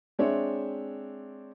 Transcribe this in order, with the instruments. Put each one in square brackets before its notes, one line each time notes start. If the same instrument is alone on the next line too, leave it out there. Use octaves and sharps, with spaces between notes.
[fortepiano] G#3 C4 D4 C#5 D5 E5